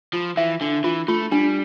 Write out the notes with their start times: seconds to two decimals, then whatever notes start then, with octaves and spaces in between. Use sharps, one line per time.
0.13 F3 F4
0.37 E3 E5
0.61 D3 D4
0.84 E3 F4
1.08 A3 F4
1.32 G3 D4